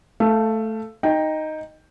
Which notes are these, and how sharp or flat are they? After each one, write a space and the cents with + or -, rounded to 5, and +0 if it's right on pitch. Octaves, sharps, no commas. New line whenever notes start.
A3 +0 F5 -20
D#4 +0 G5 +10